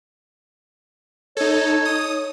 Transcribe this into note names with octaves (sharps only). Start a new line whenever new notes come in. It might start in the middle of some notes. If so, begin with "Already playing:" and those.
D#4 A4 C#5
D#6